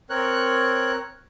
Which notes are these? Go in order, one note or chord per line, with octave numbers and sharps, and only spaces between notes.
C4 A#4 C#5 F#6